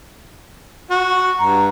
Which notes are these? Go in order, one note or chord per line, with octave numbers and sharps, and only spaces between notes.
F#4
G2 A#5